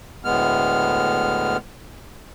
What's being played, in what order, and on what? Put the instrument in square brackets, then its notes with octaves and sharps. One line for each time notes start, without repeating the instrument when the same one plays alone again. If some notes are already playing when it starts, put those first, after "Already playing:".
[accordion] D2 A2 G#3 B3 F6